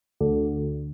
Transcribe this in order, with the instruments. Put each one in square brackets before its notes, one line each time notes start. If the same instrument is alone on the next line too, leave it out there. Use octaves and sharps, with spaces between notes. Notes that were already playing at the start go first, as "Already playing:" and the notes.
[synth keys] D2